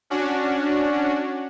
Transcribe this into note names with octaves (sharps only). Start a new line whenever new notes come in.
C#4 D4 F#4